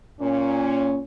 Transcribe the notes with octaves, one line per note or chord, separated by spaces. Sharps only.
A#2 C#4